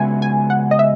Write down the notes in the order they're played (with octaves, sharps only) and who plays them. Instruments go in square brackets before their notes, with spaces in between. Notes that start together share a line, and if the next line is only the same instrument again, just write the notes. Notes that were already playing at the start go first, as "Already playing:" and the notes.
Already playing: [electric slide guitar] C#3 G#3 B3 F#4 [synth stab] E5 G#5
[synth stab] G#5
F#5
D#5
E5